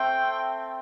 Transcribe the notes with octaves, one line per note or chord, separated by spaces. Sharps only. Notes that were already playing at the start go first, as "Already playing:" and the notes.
Already playing: A3 C4 G5